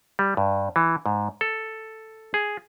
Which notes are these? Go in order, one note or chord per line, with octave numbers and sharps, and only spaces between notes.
G3
G2
E3
G#2
A4
G#4